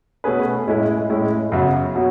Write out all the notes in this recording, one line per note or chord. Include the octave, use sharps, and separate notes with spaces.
B2 A3 C#4 G#4 B4
A2 G#3 C#4 E4 G#4
A2 G#3 C#4 E4
F#2 C#3 F#3 B3
B2 F#3 C#4